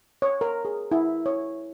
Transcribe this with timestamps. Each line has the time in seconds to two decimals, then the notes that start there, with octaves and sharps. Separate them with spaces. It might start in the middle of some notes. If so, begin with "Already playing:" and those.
0.22 C#5
0.41 A#4
0.65 G#4
0.91 E4
1.26 C#5